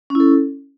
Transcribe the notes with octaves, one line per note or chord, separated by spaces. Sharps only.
C#4 E4 A4